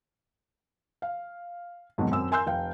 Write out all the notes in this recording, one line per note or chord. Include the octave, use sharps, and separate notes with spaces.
F5
F2 G#2 B2 D#3 F#3
F#2 C4 E6
A#4 G#5 C6 E6 G6
F1 F5 G5